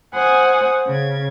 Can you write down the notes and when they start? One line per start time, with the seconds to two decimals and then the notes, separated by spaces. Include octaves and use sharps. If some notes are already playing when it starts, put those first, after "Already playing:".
0.15 C5 F#5 G#5 D#6
0.87 C#3 G#6